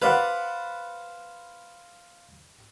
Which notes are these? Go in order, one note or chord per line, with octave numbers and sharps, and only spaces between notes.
B4 C5 D5 F5 F#5